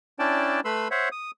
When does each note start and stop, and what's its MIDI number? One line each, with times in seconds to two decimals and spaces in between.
0.19 0.60 61
0.19 0.60 62
0.19 0.60 64
0.19 0.60 74
0.19 0.60 79
0.19 0.60 81
0.65 0.88 57
0.65 0.88 71
0.65 0.88 83
0.65 0.88 84
0.65 0.88 88
0.91 1.09 72
0.91 1.09 73
0.91 1.09 76
0.91 1.09 78
1.12 1.31 87